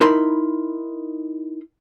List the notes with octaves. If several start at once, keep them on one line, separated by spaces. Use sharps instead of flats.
D#4 E4 A#4 B5 C6